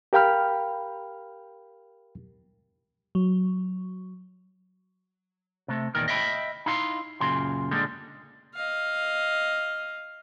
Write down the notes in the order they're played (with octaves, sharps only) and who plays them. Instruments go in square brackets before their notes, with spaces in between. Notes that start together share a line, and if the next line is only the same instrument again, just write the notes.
[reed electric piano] G4 A#4 F5 G5 B5 F6
[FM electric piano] F#3
[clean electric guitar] C3 A3
E2 A#2 D#3 A#4
D#5 E5 G5 B5
D#4 E4 F5 C6
F#2 A#2 C#3 C6
A#2 D3 G3 G#3
[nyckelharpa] D#5 F5